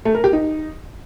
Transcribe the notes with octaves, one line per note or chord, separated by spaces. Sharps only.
A3
A#4
G4
D#4